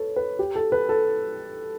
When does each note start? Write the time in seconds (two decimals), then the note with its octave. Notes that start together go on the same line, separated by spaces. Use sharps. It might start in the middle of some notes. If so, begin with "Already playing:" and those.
Already playing: A4 B4 C#5
0.16 B4
0.39 G4
0.56 A4
0.72 B4
0.89 A4